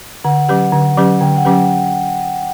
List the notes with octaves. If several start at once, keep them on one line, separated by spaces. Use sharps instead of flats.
D3 F#5
F#3 C#4 G4 B4
D3
F#3 C#4 G4 B4
D3 G5
F#5
F#3 C#4 G4 B4